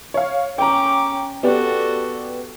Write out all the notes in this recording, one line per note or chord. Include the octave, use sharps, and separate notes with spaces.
C#5 F5
C#4 G5 A#5 D6
B3 F#4 G4 A4 D5